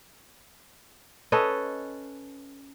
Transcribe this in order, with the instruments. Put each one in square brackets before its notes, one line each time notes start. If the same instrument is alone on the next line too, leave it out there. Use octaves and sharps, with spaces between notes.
[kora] C#4 A4 B4 D#5